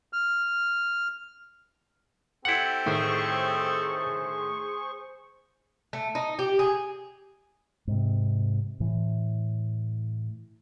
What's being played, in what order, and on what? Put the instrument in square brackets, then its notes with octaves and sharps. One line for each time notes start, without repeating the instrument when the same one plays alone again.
[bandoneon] F6
[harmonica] C4 G4 A4 [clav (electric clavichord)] E4 F#5
[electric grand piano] A2 D#3 A3 [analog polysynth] G#4 C5 C#6
[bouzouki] A3
D#4
G4
G#4
[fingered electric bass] G#2 C3
A2 E3